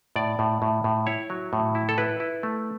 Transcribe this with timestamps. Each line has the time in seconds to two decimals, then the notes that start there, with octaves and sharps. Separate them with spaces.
0.16 A2 D5
0.39 A2
0.62 A2
0.84 A2
1.06 E4 C#5
1.30 F#3
1.53 A2
1.75 E4
1.89 A4
1.98 E4 B4
2.20 E4
2.43 A3